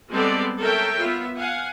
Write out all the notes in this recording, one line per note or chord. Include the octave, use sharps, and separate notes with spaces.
G3 G#3 B3 C4 A4 D5
A4 A#4 C#5 E5 G5
B3 F4 E5
F5 F#5 G#5